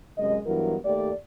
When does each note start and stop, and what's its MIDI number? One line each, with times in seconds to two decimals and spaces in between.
0.18 0.38 42
0.18 0.38 48
0.18 0.38 56
0.18 0.38 75
0.46 0.77 43
0.46 0.77 52
0.46 0.77 54
0.46 0.77 59
0.46 0.77 70
0.85 1.11 39
0.85 1.11 57
0.85 1.11 67
0.85 1.11 74